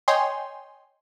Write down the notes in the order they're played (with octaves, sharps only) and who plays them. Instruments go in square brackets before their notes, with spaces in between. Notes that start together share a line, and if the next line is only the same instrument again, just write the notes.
[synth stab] C#5 D#5 G5 G#5 C6